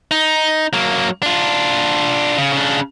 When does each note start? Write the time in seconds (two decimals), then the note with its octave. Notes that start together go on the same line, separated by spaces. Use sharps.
0.11 D#4
0.73 F#3 A#3
1.23 D4 F4
2.38 C#3
2.53 C#3 D4